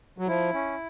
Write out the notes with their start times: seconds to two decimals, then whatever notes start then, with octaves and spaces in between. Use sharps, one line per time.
0.18 F#3
0.27 F3 E4
0.54 C#4